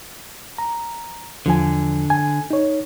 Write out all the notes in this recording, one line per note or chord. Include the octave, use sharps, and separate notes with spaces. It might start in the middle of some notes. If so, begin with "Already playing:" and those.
A#5
E2 D3 F3 G#5
G#5
D#4 C#5